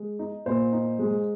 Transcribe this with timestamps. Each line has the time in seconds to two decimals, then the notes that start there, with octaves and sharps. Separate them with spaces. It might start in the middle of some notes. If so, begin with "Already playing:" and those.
Already playing: G#3
0.19 D#4
0.46 A#2 C5
0.72 D#4
0.99 G#3